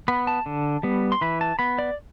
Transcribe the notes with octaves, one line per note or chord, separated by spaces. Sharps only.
B3 B5
A5
D3
G3 B3
C6
E3 B5
A5
B3 B5
D5